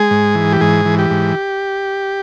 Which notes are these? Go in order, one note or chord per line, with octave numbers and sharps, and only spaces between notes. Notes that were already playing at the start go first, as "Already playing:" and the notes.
Already playing: G#3 G#4
G#2
E3
G4
G#2 G#4
E3
G4
G#2